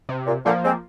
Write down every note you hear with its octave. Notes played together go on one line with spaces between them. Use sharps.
C3
A#2
A#2 D3 F3 A#3
G#3 C4